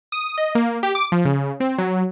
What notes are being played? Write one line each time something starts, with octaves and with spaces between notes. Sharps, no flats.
D#6
D#5
A#3
G4
D6
F3
C#3
C4
F#3